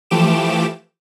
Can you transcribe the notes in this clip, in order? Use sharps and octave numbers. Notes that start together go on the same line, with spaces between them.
E3 F3 A3 G4 D6 E7